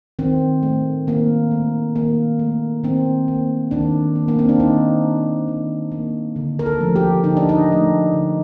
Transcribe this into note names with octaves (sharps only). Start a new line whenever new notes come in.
D#3 C4
A3
D#3 A#3
A3
D#3 A#3
A3
D#3 C4
A#3
D#3 D4
A#3
A#3
C4
D4
D#3 D#4
A#3
D#3
A#3
D3
A#4
A4
F3 A3
G4
D3 D#4
D4
D#4
F3 A3
D3